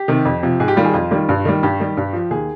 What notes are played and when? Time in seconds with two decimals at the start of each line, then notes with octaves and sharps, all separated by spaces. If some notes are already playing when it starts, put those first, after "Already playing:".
Already playing: G4
0.08 C3 D#3
0.25 F2
0.43 C3 F3
0.60 G#2 G#4
0.68 G4
0.76 D#3 G3 F4
0.85 G#4
0.94 F2 F4
1.11 D#3 G3
1.29 G2
1.45 D#3 G3
1.63 G2 G4
1.80 D#3 G3
1.97 G2
2.13 F3
2.31 D#2 G#4